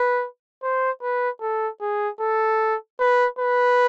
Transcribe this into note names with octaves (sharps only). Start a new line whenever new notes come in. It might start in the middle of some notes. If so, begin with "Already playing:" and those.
Already playing: B4
C5
B4
A4
G#4
A4
B4
B4